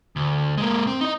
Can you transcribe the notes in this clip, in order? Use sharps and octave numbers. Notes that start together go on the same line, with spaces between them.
D2
G#3 A#3
C4
D#4 D#5